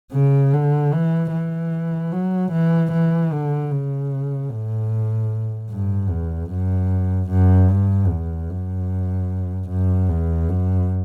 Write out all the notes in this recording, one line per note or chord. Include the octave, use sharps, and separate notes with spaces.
C#3
D3
E3
E3
F#3
E3
E3
D3
C#3
A2
G2
E2
F#2
F#2
G2
E2
F#2
F#2
E2
F#2